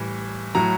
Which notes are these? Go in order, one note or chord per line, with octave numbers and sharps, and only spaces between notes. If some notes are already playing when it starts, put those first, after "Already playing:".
Already playing: A2 E3 G3
A2 F#3 A#5